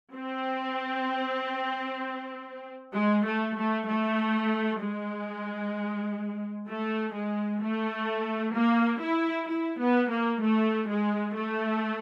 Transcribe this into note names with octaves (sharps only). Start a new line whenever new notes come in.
C4
G#3
A3
A3
A3
G#3
A3
G#3
A3
A#3
E4
E4
B3
A#3
A3
G#3
A3